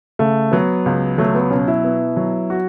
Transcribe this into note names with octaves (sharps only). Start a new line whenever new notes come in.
C#3 A3
F#3 B3
C#2
F#3 A3
B3
B2 C#4
E4
B3
F#3
F#4